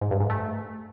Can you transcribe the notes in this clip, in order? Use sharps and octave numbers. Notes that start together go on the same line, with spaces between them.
G#2
G2
G#2
A3